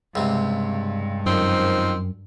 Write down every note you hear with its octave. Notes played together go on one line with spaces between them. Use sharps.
C#2 G2 C3
F#2 D#3 F3 C4